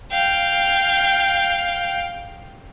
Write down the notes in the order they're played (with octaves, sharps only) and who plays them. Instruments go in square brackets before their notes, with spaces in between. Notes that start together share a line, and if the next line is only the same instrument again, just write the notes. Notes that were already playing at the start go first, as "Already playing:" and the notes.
[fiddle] F5 G5